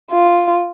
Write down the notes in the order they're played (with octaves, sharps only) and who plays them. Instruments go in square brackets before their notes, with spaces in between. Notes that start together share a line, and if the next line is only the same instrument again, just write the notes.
[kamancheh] F4